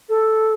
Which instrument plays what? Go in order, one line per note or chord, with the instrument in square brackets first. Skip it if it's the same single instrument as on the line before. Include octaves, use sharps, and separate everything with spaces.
[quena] A4